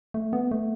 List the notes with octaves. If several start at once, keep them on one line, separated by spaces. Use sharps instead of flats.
A3
B3
A3